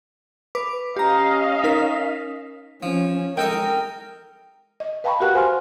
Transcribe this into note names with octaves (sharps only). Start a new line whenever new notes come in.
B4 D6
C#4 G4 D#5 F5 A#5
D#4 A#4 B6
F3 C#4
G#3 A4 A#4 D#5 G5
D#5
B4 F5 G5 A5 B5 C#6
F#4 G4 A#4 F5 F#5 F#6
F#4 C5 G#5 C6 F6